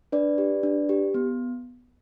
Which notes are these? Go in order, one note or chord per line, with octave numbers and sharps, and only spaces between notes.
D4 B4 D5
G4
D4
G4
B3